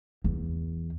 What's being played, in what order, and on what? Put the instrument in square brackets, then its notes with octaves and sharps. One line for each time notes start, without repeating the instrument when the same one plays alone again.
[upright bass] E2